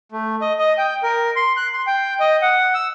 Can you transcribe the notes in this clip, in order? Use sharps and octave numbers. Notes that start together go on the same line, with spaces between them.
A3
D#5
D#5
G5
A#4
C6
F#6
C6
G5
D#5
F#5
E6